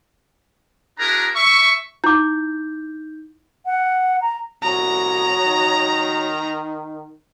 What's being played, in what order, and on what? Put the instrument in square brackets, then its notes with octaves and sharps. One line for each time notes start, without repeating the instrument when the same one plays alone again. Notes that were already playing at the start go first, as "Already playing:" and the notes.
[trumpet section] D4 E4 F#4 G#4 A#4 A#5
E5 C#6
[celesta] D#4 G6 [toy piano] E4 D6
[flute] F#5
A#5
[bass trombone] C2 [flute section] F#4 C#5 D#6 [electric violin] A#5
[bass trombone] D#3